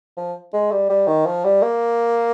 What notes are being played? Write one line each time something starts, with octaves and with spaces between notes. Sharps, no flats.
F3
G#3
G3
G3
D#3
F3
G3
A#3